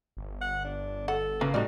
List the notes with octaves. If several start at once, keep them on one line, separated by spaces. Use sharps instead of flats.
G1
F#5
D4
A4 F#5
C#3 A#3 B4
A2 G3 D#4 F#4 D5